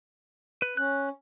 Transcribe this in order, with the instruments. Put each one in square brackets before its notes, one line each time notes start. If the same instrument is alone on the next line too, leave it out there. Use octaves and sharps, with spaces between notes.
[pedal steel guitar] B4
[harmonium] C#4 [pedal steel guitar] F#6